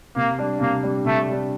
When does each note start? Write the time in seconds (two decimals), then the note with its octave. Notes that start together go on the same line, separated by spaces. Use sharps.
0.16 C3 A#3
0.39 G3 D4
0.60 C3 A#3
0.83 G3 D4
1.05 C3 A3
1.28 G3 D4